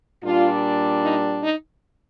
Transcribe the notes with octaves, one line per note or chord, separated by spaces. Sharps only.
A#2 G3 D4 F4
D#4
D#4